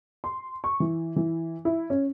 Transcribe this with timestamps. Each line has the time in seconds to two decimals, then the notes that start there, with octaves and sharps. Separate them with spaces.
0.24 C6
0.64 C#6
0.80 E3
1.16 E3
1.65 E4
1.90 C#4